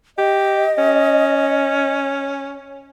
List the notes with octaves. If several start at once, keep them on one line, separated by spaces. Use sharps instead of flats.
G4 D#5
C#4